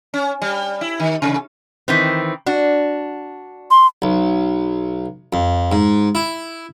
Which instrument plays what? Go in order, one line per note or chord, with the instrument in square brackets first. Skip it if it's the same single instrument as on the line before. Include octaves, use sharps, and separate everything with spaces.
[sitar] C#4
G3
E4
D#3
C3
[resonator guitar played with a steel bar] D#3 E3 C4
D4 F#4
[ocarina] C6
[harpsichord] B1
F2
G#2
E4